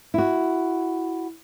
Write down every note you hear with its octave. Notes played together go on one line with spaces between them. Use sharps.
E4 F#4